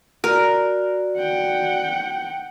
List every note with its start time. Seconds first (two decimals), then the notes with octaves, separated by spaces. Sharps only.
0.24 F#4 A#4 D5
1.17 F#5 G5